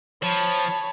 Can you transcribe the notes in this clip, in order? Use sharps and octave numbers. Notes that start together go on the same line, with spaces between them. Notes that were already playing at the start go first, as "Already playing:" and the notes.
F3 C#5 A5 B5